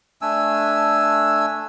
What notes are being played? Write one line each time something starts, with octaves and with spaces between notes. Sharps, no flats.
A3 D4 G#5 E6